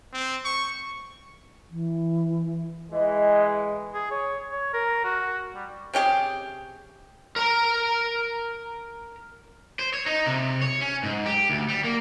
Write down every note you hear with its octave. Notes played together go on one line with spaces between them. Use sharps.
C4
C#6
E3
E3 G#3 D#5
G#4
C#5
C#5
A#4
F#4
G3
C3 C#4 G4 G#4
A#4 A#5
C5
C#5
D#4
C3
C#5
C#4
G#2
G4
D2
G3
A#3